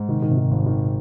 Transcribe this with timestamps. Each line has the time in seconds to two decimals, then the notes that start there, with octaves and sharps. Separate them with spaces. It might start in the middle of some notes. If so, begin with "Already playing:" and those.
Already playing: G#2
0.09 C3 D#3
0.20 A#2 D#3
0.31 G#2 C3
0.37 D#3
0.51 G#1
0.66 D#3